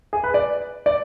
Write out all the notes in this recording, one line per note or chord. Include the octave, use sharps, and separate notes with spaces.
G#4
B4
D5
D5